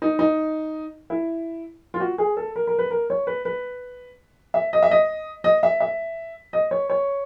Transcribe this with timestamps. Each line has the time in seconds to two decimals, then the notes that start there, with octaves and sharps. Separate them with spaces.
0.02 D#4
0.19 D#4
1.10 E4
1.94 F4
2.00 F#4
2.18 G#4
2.37 A4
2.56 A#4
2.67 A#4
2.79 B4
2.91 A#4
3.10 C#5
3.27 B4
3.45 B4
4.54 E5
4.73 D#5
4.83 E5
4.91 D#5
5.44 D#5
5.63 E5
5.80 E5
6.53 D#5
6.71 C#5
6.90 C#5